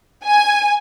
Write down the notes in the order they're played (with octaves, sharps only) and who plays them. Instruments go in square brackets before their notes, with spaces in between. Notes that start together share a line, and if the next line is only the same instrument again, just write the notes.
[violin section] G#5